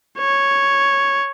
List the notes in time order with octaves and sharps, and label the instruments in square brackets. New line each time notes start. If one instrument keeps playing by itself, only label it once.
[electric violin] C#5